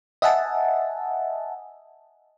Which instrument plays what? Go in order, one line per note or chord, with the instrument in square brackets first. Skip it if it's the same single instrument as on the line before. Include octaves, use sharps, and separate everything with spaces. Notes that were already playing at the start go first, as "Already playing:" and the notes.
[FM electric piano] D#5 E5 F#5 G#5 A5